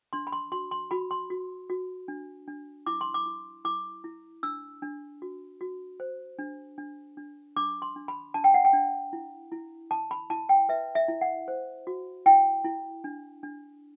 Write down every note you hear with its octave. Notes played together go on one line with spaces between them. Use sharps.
D4 C6
B5
C6
F#4 C6
C6
F#4 B5
C6
F#4
F#4
D4
D4
E4 D6
C6
D6
E4
E4 D6
E4
D4 E6
D4
F#4
F#4
C5
D4
D4
D4
D4 D6
C6
D4
B5
D4 A5
G5
F#5
G5
D4
E4
E4
E4 A5
B5
E4 A5
G5
B4 E5
E5
E4
F#5
C5
F#4
E4 G5
E4
D4
D4